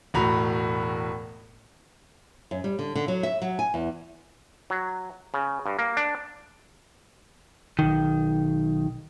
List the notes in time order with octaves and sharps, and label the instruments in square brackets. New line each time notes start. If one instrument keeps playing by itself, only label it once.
[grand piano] E1 A2 F#4 A#5 B5 F7
[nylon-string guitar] F#2
G3
D3
D3
F#3
E5
F#3
G#5
E2
[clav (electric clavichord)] F#3
C#3
G2
A#3
D4
[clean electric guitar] B1 D#3